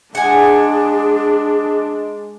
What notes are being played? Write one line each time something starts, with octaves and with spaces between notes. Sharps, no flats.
G#3 D4 G#4 F#5 G#5